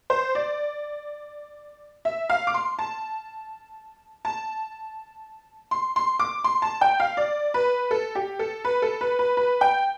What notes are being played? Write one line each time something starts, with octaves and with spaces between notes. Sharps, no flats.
C5
D5
E5
F5
D6
C6
A5
A5
C6
C6
D6
C6
A5
G5
F5
D5
B4
A4
G4
A4
B4
A4
B4
B4
B4
G5